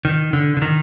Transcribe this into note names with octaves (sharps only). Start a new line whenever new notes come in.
D#3
D3
D3
D#3